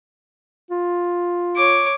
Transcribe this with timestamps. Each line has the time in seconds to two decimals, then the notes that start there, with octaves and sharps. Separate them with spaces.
0.71 F4
1.56 C#5 D6